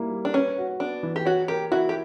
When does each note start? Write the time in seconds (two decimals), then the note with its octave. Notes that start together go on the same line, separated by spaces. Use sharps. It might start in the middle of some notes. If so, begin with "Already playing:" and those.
Already playing: G3 A#3 E4
0.11 G3
0.25 D4
0.34 C#4 B4
0.58 F#4
0.80 B3 D4
1.03 E3
1.16 G4
1.25 F#4 C#5
1.48 G4 A#4
1.71 E4 F#4
1.89 G4